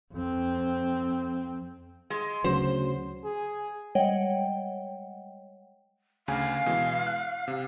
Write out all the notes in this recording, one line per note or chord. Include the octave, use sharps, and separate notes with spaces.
F2 C4
G#3
D2 C#3 F#3 C5
G#4
G3 G#3 C#5 D#5 F#5 G5
D2 C#3 F5 G#5
B2 E3 G#3
F#6
C3